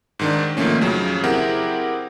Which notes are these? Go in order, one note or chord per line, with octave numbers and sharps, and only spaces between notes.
G#2 D#3 D4
G#2 D#3 F3 A3 A#3 C#4
F2 C#3 F#3
C4 E4 G4 G#4 A#4 F#5